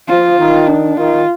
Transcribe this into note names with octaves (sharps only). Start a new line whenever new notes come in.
F3 F4
D#3
D4
D#3 F4